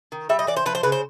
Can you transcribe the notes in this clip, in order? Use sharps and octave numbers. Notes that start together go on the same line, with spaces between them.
D#3
G3 E5
D#5
E3 D5
C5
F3 B4
C5
C#3 B4
C5